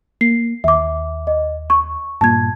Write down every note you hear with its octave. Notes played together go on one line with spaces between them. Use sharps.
A#3 C7
D#2 E5 D6
D#5
C#6
G2 A#2 A5 G#6